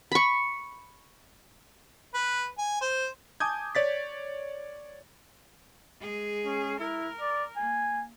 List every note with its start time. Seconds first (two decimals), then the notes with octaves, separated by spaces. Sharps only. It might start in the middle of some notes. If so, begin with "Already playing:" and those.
0.12 B5 C#6
2.14 B4
2.59 G#5
2.81 C5
3.40 G#5 A5 D6 D#6 G6 G#6
3.75 C#5 D5 A6 B6
6.00 G#3 G#4
6.45 C#4
6.80 E4 A#4
7.21 D5
7.57 A#3 G#5